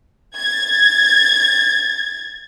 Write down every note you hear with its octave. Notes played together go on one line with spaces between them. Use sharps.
G#6 A6